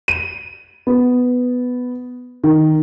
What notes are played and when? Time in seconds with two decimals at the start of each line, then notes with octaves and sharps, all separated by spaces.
0.08 D#7
0.87 B3
2.43 D#3